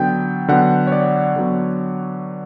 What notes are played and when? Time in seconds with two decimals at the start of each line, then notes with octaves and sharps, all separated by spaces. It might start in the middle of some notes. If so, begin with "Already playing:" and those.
Already playing: D3 F#3 B3 G5
0.48 D3 F#3 B3 F#5
0.87 C#5
0.92 D5
1.36 D3 F#3 B3